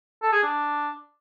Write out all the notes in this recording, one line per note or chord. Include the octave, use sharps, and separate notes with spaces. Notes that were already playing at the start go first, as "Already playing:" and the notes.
A4
G#4
D4